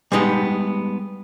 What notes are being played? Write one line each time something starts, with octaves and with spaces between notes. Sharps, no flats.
G3 G#3 B3 D#4 G4